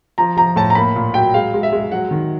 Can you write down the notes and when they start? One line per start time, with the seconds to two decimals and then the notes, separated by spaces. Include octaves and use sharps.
0.18 F3 A#5
0.37 F3 A#5
0.56 A2 A5
0.70 A#5
0.75 A#3 B5
0.96 A#2
1.14 F#3 G5
1.34 G#3 F5
1.54 G#3
1.63 E5
1.72 G#3
1.92 F#3 F#5
2.11 D#3